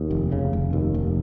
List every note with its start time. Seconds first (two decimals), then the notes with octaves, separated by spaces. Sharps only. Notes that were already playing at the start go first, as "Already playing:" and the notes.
Already playing: D#2
0.11 F1
0.32 C#3
0.53 F1
0.73 D#2
0.94 F1